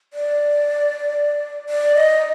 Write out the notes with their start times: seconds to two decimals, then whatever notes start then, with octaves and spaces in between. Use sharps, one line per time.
0.13 D5
1.69 D5
1.95 D#5